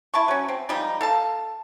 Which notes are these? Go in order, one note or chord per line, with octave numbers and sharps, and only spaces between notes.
E4 A5 C#6
F#3 C#4
C4
F3 G3 G#3 D#4
A4 F5 A5